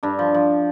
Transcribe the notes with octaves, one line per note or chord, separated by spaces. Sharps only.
G2 D4
F3
F3